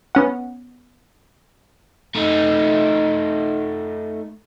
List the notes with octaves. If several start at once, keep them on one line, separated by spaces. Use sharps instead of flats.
B3 C#4 F#5
A3 D#4